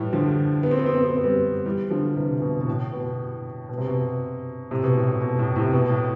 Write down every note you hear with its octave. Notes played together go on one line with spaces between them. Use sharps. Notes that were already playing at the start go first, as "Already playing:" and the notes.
Already playing: A2 E3 G3
D3 F3
B3
C4
B3
C4
B3
C4
B3
C4
G3 B3
E3 G3
D3 F3
C3 E3
B2
B2
A2
B2
B2
C3
B2
A2 C3
B2
A2
A2
B2
A2
A2 C3
B2
A2